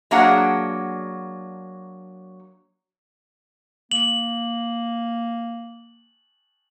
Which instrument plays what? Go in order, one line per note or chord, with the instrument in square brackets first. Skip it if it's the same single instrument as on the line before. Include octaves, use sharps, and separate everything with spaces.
[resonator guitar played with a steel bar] F#3 A#3 D4 G#4 F#5
[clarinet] A#3 [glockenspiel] F#7